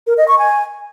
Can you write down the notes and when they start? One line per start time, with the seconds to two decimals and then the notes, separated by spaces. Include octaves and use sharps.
0.07 A#4
0.17 D#5
0.28 C#6
0.39 G#5